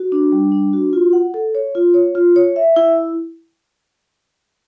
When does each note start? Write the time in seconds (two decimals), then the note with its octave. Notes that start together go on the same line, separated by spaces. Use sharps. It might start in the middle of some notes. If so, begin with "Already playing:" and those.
Already playing: F#4
0.12 D4
0.32 G3
0.52 D4
0.73 F#4
0.93 F4
1.13 F#5
1.34 A4
1.55 C#5
1.75 F4
1.94 C#5
2.15 F4
2.36 C#5
2.56 E5
2.76 E4